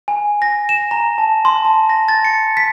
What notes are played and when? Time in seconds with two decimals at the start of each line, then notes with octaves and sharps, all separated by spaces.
0.08 G#5
0.42 A#6
0.69 E7
0.91 A#5
1.18 A5
1.45 C6
1.65 A5
1.89 A#6
2.08 A6
2.25 C#7
2.57 B6